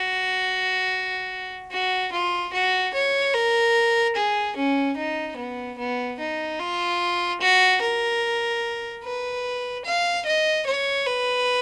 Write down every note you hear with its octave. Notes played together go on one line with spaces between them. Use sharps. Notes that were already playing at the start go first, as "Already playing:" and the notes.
Already playing: F#4
F#4
F4
F#4
C#5
A#4
G#4
C#4
D#4
B3
B3
D#4
F4
F#4
A#4
B4
F5
D#5
C#5
B4